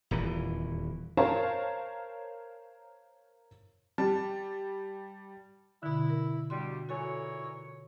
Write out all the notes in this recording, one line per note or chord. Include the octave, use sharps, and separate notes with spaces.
D#1 E2 E3
A#4 C5 C#5 F5 A5 A#5
G3 A5
B2 D3 E4
A#4
G2 B2 G3 F#4 C6
A#2 E3 F#4 A4 C#5 G#5